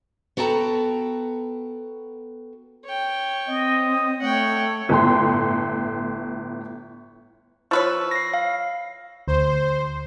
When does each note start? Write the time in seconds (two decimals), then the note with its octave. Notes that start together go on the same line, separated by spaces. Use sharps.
0.37 B3 F#4 A4 G5 A#5
2.85 C#5 G5
3.48 C4 D#5
4.21 A3 C#5 F#5 G5
4.89 G1 A2 A4 G5 C6
7.71 F3 B4 C#5 C#6 E6
8.11 A#6 C7
8.34 F5
9.28 D2 C5